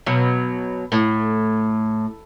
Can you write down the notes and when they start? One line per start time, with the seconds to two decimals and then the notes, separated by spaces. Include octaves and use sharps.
0.06 B2 F#3
0.92 A2